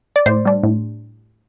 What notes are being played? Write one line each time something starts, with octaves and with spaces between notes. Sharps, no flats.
D5
A2 C5
G3 D4
A2